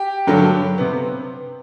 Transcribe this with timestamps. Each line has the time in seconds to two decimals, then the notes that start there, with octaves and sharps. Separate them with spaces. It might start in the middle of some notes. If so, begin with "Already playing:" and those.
Already playing: G4
0.27 G2 D3 F#3
0.78 C3 B3